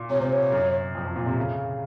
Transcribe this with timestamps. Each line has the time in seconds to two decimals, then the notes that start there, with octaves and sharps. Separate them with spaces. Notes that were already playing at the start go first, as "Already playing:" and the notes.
Already playing: A#2
0.10 C3 C#5
0.20 C3 C5
0.33 C#5
0.52 F#2
0.95 F2
1.05 F2
1.16 A#2
1.26 C3
1.37 C#3